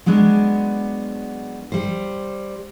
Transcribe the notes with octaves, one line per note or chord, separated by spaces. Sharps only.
F#3 G#3 B3 D4
G3 C5